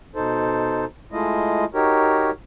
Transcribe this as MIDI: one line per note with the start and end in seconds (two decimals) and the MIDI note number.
0.15 0.85 47
0.15 0.85 63
0.15 0.85 69
0.15 0.85 72
1.12 1.65 56
1.12 1.65 57
1.12 1.65 64
1.12 1.65 65
1.12 1.65 75
1.74 2.31 63
1.74 2.31 66
1.74 2.31 67
1.74 2.31 70
1.74 2.31 73